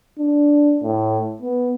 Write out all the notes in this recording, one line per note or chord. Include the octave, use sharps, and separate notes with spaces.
D4
A2
B3